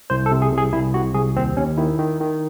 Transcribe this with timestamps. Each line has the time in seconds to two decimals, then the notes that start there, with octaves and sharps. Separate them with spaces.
0.10 C2 C5
0.26 A4
0.31 C3
0.42 G#4
0.52 C2
0.57 G#4
0.73 C2 E4
0.94 C3 F#4
1.15 C2 G#4
1.36 D#2 C4
1.57 D#2 C#4
1.78 D#3 E4
1.99 D#3
2.20 D#3